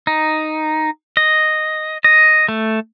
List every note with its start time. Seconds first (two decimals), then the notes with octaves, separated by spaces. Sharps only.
0.07 D#4
1.17 D#5
2.04 D#5
2.49 A3